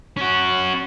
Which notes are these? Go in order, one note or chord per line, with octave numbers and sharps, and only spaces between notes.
C#4 F#4